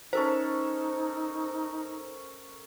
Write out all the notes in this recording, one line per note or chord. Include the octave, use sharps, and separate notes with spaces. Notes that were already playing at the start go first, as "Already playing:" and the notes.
C#4 D#4 A4 A#4 C5